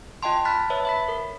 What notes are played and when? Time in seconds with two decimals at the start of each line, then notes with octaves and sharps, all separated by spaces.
0.23 F4 D#5 G5 A5 C6
0.45 A5 B5 F6 F#6 A6 B6
0.70 B4 C#5 E5 A5
0.85 E5 B5 B6
1.08 A#4